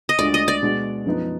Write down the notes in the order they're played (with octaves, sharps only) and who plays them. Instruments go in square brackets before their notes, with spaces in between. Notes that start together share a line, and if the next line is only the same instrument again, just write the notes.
[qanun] D#5
[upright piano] D2 D3 G#3 D4 F4 [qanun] D5
[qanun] D#5
D5
[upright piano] B2 G#3 D4 F#4
F#2 F3 B3 D#4